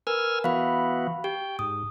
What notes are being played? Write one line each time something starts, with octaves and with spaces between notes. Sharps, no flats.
A#4 B4 G#5 E6 F6
E3 B3 F#4 F5 B5
G4 G5
G#2 D#6